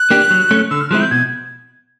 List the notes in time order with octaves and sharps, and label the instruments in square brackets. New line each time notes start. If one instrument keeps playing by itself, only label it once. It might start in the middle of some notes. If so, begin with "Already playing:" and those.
Already playing: [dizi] F#6
[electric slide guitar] A#3 D4 G4
F#3
A3 C#4
[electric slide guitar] D3 [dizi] E6
[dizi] F6
[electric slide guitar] F3 G#3 C4 E4 [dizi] F#6
[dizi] G6
[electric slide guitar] B2 [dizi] G#6